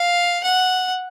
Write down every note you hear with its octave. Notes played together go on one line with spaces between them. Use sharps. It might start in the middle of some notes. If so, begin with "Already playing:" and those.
Already playing: F5
F#5